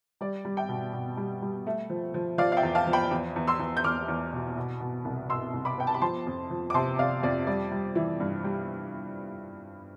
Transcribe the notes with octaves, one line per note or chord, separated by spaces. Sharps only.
G3 D5
G3
E5 G5
B2
B2
G3
G3
A3
F3
F3
F3 D5 F5
F5
E5 G5
E2
F5 A5
F3
G5 B5
E2
E2
C6 E6
E2
G6
E2 D6 F6
E2
B2
B2
B2
C2
B2 C6 E6
C2
B5 D6
B3 G5
A5
B5
F3 A5 C6
F2
F3
D6
C3 A5 C6
C3 D5 F5
F2 D5
G3 D5
G3
E3
G2
G3